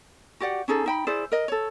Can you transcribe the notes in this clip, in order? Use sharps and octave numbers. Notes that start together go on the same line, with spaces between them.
F#4 G4 D5 F#5
C#4 D#4 G#4 A4
D#4 G5 B5
E4 G#4 C5 D5
A#4 D#5
A4 C#5